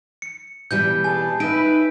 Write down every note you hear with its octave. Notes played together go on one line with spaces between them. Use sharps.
C#7
B2 E3 G3 G6
G#4 G#5 A5
D#4 B4 E5 D7